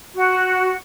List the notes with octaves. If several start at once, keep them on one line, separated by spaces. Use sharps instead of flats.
F#4